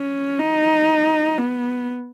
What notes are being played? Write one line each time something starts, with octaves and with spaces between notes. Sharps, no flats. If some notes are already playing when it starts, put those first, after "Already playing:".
Already playing: C#4
D#4
B3